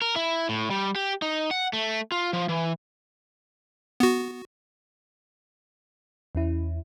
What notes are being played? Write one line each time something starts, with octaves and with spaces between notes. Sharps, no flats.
A#4
E4
A2
G3
G4
D#4
F#5
A3
F4
F3
E3
B3 F#4
E2 C#4 E4